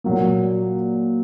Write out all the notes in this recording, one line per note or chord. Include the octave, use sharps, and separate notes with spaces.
A#2 F#3 A#3